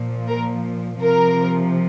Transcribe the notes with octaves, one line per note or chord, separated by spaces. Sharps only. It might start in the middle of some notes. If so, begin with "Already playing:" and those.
Already playing: A#2 F3
A#4
C3 F3 A#4